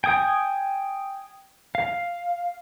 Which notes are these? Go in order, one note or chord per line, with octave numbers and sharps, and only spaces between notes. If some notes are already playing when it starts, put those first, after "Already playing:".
G5 G#5 D#6
F5